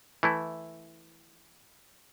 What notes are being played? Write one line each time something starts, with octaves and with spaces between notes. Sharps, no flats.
E3 A3 E4